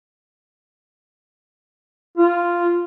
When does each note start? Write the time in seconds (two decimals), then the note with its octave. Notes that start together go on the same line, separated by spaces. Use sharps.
2.17 F4